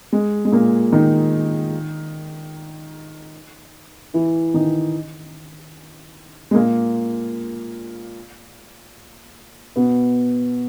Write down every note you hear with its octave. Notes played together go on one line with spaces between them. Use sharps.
G#3
G#3
A#2 A#3
D#3 D#4
E3 E4
D#3 D#4
G#3
A#2 A#3
B2 B3